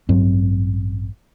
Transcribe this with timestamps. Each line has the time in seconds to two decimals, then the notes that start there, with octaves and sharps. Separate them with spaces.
0.09 A1 G2 F#3 C4